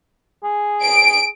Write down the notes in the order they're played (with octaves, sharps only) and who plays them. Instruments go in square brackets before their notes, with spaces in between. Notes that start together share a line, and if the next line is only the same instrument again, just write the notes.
[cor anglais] G#4
[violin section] D7